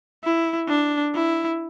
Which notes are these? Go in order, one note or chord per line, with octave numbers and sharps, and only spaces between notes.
E4
D4
E4